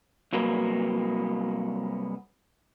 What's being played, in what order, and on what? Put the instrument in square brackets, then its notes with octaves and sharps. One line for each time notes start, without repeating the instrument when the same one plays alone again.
[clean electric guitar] C2 F#3 A#3 B3